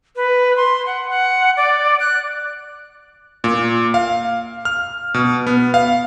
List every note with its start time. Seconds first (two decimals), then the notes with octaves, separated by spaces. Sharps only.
0.16 B4
0.57 C6
0.86 F#5
1.10 F#5
1.57 D5
2.00 F#6
3.44 A#2
3.94 F5
4.65 F6
5.14 B2
5.47 B3
5.74 F5